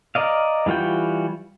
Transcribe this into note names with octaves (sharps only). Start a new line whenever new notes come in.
A#4 D5 D#5 F5
E3 G3 F4 F#4 G5